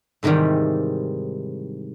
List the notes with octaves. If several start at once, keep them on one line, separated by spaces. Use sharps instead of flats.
G#2 C3 D#3 E3 G3